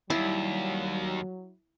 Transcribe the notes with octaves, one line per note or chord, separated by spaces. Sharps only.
D#2 F#3 G3 E4